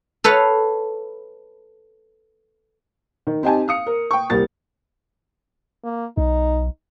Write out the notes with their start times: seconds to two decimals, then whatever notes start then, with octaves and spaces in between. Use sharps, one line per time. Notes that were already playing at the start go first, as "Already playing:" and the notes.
0.24 A4 B4 C#5 F5
3.27 D#3
3.43 C4 D#4 G4 G#5 A5
3.68 F5 D#6 C#7
3.86 A#4
4.11 G5 C#6
4.30 D#1 C2 G3 A#4 A6
5.84 A#3
6.17 B1 D#4